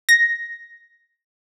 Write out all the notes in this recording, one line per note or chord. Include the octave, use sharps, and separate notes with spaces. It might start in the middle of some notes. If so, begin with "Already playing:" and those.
A#6